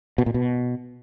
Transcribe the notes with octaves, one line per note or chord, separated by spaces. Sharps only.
B2
A#2
B2